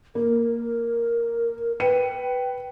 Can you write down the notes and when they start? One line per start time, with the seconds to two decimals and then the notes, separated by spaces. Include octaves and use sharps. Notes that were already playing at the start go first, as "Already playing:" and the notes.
0.15 A#3 A#4
1.80 B4 G5 C#7 D#7